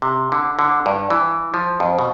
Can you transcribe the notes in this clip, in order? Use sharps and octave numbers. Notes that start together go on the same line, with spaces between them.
C3
D3
D3
G2
E3
F3
F2
B2